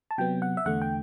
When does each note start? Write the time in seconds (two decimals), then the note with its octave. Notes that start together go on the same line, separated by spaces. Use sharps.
0.11 A5
0.18 C3 F#3 B3 G5
0.42 F#5
0.57 E5
0.65 E2 D3 A3 F#5
0.82 G5